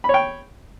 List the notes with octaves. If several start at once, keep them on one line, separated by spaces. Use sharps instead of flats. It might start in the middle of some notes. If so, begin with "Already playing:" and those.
C#5 G5 B5